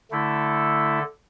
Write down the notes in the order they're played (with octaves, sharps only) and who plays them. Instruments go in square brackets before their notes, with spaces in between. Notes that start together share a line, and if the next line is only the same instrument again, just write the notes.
[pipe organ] D3 A3 E4 A4